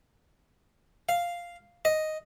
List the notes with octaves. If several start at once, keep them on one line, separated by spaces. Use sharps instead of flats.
F5
D#5